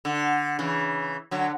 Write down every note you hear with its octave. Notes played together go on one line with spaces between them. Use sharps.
D3
C#3 E3
D3 F#3